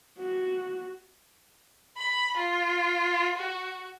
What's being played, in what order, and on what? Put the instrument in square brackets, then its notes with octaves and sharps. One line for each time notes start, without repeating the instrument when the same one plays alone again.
[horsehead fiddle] F#4
[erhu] B5
F4
F#4